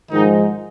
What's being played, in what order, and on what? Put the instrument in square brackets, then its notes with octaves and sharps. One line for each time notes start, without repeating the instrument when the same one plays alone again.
[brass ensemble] G#2 D#3 F3 G#3 D#4